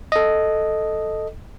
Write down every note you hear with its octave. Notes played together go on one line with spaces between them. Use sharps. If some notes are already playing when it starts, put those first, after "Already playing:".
A4 D#5